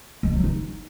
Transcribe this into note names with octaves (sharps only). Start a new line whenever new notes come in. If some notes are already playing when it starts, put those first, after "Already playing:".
G#3
F#3
D#4